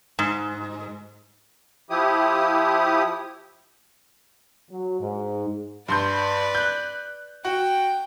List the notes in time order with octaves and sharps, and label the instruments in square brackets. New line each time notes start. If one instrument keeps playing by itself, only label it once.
[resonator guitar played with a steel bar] G#2
[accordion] F3 E4 G4 D#6
[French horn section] F#3
G#2
[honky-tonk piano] G2 C6 G6 [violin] B4 D5
[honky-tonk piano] F#6 G6
[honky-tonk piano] F#4 [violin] G5